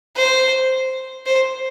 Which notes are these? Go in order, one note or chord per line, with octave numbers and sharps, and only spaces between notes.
C5
C5